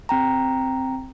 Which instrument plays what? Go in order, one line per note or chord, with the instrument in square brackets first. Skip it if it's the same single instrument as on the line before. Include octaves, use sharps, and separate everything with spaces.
[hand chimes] C4 G5 A#5